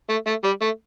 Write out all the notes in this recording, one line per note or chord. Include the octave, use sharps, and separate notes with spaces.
A3
A3
G3
A3